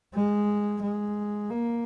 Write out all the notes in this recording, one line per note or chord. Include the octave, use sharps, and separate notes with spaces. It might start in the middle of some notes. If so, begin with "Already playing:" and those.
G#3
G#3
A#3